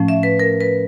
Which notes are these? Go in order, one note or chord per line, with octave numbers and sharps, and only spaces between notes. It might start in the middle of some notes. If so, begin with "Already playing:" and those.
Already playing: A2 F3 A3 C#4
E5
B4
A#4
B4